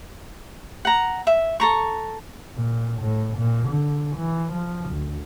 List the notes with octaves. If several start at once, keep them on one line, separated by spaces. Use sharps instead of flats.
F#5 A#5
E5
A4 A#5 C#6
A#2
A2
A#2
D3
E3
F3
D2